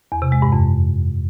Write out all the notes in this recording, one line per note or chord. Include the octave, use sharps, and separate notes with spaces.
E2
C3
G#3
G2
F2